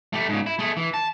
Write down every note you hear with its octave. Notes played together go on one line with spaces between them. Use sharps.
A3 G4
G#2 C#3
E4
A3 G#4
E3
A5